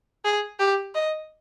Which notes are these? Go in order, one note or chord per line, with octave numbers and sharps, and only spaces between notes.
G#4
G4
D#5